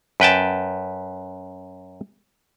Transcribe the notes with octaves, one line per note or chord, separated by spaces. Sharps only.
F#2 B4 G5 A5